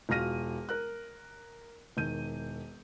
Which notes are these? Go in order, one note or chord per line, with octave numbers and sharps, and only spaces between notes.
E1 F4 F#4 F6 A#6 D#7
A#4 F#6
E1 D#3 G6 D#7